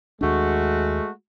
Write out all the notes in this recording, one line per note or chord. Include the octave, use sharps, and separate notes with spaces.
D#2 G#3 A3 D4 F#4